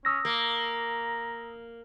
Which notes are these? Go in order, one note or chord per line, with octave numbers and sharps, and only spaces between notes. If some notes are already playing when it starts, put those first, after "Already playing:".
C#4 D#6 E6 A#6
A#3 A#5